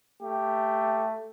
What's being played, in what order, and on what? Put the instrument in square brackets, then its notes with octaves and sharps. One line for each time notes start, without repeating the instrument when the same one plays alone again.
[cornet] A3 [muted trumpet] G4